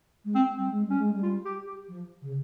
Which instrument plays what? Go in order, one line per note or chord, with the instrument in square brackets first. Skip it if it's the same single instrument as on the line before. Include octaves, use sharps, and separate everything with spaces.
[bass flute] G#3
[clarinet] C4
[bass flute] G3 [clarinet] C4
[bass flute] G#3
[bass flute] G3 [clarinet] C#4
[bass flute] G#3
G3
[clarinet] F4
G4
G4
[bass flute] F3
C#3